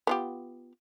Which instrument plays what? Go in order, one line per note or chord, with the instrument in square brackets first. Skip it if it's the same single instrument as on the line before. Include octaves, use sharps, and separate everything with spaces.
[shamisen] B3 F4 G4